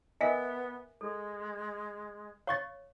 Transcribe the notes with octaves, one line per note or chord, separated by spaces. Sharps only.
B3 A#4 D#5 E5 G#5 B6
G#3 A4
C#5 F5 C#6 A6